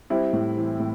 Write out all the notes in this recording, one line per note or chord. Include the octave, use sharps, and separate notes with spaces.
G3 C4 E4
A2
E3
A2